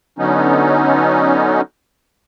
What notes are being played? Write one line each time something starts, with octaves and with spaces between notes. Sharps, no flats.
D3 F#3 B3 C#4 D#4